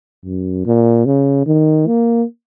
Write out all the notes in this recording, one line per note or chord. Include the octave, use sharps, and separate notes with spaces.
F#2
A#2
C#3
D#3
A#3